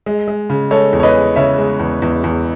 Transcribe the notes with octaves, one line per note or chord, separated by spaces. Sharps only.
G#3
G#3
C#3
G#3 A4 C#5
E2
C#5
B4 D#5
G#3
C#3 C#5 E5
G#3
E2
E2
E2